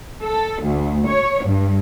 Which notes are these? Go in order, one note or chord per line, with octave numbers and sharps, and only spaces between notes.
A4
D2
C#5
G2